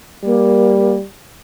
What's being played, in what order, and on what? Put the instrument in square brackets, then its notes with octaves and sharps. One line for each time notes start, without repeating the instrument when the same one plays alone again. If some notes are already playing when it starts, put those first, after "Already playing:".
[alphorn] G3 [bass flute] A#3